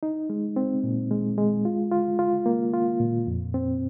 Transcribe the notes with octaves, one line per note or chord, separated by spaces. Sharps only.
D#4
G#3
C4
A#2
G#3
G#3
F4
F4
F4
A#3
F4
A#2
F2
C4